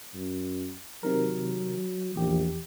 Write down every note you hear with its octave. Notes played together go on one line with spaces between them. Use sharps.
F#2
C3 D#3 F#3 A#4
A#1 E2 G4